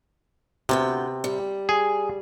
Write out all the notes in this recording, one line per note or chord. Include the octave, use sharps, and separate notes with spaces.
D2 C3 B3 G5
G3
G#4